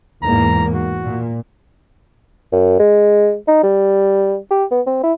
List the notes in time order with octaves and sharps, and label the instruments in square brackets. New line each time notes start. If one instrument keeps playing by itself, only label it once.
[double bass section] E2 G#2 A#3 [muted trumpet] A#5
[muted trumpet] F#4
[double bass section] A#2
[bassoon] F#2
G#3
D#4
G3
G4
B3
C4
E4